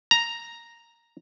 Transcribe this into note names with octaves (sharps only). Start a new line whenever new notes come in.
A#5